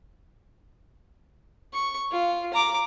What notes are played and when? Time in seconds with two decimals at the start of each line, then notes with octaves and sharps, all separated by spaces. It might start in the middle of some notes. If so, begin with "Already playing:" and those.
1.74 C#6
2.12 F4
2.53 A#5 D6